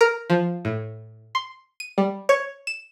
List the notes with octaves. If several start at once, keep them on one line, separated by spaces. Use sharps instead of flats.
A#4
F3
A2
C6
D#7
G3
C#5
E7